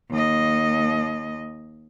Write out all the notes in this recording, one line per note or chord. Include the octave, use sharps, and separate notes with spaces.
D#2 D#5